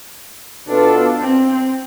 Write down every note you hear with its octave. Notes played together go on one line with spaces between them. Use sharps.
B2 B3 D4 F4 A4
C4